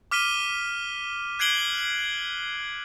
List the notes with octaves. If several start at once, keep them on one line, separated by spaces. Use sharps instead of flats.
D6 F6 B6 D#7 G7
F#6 G#6 C7 D7 F#7 G7